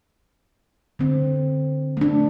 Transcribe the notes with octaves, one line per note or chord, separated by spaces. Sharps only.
D3 C4
A3 D4